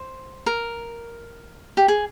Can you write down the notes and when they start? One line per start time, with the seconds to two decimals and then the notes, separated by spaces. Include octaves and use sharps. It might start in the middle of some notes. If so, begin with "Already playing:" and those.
Already playing: C5
0.46 A#4
1.77 G4
1.88 G#4